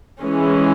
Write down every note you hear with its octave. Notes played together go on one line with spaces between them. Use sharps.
E3 G#3 C#4